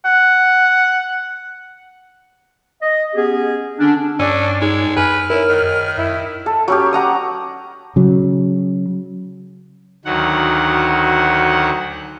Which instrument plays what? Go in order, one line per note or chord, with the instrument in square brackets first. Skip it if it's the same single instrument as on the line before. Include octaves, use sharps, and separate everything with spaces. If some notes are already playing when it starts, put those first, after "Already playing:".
[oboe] F#5
[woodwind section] D#5
B3 C#4 G4 G#4
D3 C#4 D4
[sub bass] G2 [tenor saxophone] C#4 [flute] D4 [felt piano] G#5 E6
[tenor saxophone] G#3 [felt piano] D#4 [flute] C#5
[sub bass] F#2 [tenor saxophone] B4 [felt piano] G#5 [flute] F6
[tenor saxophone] E4 [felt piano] A#4 C#5
[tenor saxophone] D#3
[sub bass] F#2 [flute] E4
[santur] A4
F#3 C#4 G4
D#5 F#5 A#5 D#6
[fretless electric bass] C#3 F#3
[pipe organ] D2 D#3 F#3 F#5